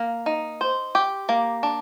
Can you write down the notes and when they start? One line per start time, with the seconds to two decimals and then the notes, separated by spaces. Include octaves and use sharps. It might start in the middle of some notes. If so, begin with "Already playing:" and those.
Already playing: A#3
0.26 D#4
0.61 C5
0.95 G4
1.29 A#3
1.63 D4